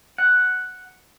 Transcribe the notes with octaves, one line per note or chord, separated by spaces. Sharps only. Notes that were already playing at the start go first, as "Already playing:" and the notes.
F#5